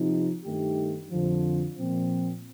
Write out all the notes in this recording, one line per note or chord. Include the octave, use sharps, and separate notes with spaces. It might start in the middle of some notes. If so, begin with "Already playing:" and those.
Already playing: C3 F3 C4 D#4 G4
G2 D#3 A3 D#4 G4
F2 D3 F3
A#2 F3 C4